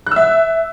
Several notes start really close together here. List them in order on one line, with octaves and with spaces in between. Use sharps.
F#6 E6 E5